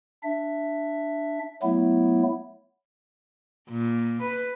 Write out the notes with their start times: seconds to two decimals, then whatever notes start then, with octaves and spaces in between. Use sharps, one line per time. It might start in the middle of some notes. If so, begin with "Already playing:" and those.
0.23 D4 E5
1.63 F#3 A3 B3 E4
3.70 A#2
4.22 B4